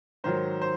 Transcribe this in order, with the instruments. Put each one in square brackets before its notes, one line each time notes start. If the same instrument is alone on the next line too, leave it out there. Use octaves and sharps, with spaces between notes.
[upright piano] G#2 D#3 F#3 C5
C5